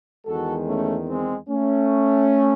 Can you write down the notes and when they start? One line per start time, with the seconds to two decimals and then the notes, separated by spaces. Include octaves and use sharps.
0.25 E2 D#3 G#3 F#4 A4
0.66 A3 C#4
1.07 G#3 C4
1.48 A3 C#4